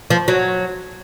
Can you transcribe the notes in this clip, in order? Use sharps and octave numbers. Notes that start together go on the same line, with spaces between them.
F3
F#3